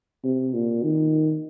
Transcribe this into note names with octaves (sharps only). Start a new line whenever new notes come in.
C3
A#2
D#3